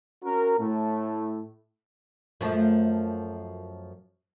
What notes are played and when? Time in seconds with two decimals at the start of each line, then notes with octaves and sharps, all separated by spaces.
0.23 C#4 F#4 A#4
0.58 A2 A3
2.41 F#2 F3 A3